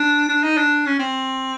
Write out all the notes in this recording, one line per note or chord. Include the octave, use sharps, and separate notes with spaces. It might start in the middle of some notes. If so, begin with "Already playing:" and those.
Already playing: D4
D4
D#4
D4
C#4
C4